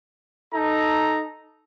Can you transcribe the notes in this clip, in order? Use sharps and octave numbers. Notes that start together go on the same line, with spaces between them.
D#4 A4 A#5